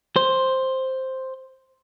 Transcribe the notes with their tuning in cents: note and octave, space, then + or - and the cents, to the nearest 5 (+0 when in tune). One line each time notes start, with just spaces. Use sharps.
C5 +5